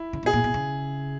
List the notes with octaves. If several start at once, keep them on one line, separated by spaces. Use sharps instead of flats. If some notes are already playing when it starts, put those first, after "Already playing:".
Already playing: E4
C#3
B2 G#4
A#2
B2
C#3